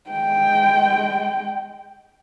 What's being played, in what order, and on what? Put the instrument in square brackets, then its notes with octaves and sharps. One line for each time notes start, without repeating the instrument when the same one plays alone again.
[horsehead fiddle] G#3 G5